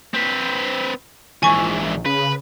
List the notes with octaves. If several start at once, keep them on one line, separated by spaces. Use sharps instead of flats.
C4 B4
A#1 G#2 E3 G#5 C#6
C#3 B4